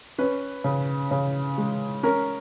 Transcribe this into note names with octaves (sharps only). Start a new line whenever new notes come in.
C#4 B4
C#3
C#3
G#3
C#4 A#4